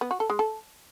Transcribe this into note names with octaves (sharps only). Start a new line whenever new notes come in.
B3
F#4
A4
G#3
A4